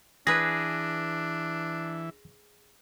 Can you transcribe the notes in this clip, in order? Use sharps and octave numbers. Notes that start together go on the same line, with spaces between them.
E3 D4 G#4 B4 A#6